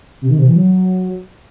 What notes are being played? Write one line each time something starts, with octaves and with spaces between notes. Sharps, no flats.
C3
D#3
C3
E3
F#3